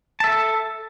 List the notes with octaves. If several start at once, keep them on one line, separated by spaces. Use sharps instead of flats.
A4 E5 A5